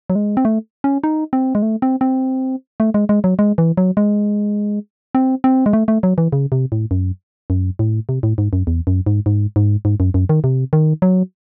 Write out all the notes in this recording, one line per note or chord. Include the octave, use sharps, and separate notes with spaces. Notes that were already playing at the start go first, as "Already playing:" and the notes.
F#3
G#3
C4
A3
C#4
D#4
C4
G#3
A3
C4
C4
A3
G#3
G#3
F#3
G#3
E3
F#3
G#3
C4
C4
G#3
A3
A3
F#3
E3
C#3
C3
A2
F#2
F#2
A2
C3
A2
G#2
F#2
E2
F#2
G#2
G#2
G#2
G#2
F#2
F#2
D#3
C3
D#3
F#3